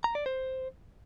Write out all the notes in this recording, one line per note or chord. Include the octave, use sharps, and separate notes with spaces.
A#5
D5
C5